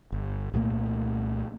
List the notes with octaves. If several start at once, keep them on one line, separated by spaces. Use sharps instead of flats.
G1
C2 A#2 A3 A#3